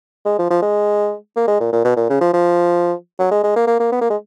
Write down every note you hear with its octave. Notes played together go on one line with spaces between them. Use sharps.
G#3
F3
F3
G#3
A#3
G#3
A#2
A#2
B2
A#2
C#3
F3
F3
F#3
G#3
G#3
A#3
A#3
A#3
B3
A#3
G#3